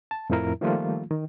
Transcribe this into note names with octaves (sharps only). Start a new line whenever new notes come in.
A5
F2 A2 F3 E4 A#4
D#3 F3 G3 A3 A#3 F4
D#3